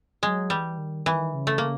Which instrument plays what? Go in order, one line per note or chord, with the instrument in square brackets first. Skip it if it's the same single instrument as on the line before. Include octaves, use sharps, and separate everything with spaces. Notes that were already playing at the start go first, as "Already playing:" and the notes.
[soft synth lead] F#3 [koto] G#3
[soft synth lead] E3 [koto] G3
[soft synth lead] D#3
[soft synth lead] D#3 [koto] E3
[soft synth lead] C#3
[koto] A3
[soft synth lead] C#3 [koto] A#3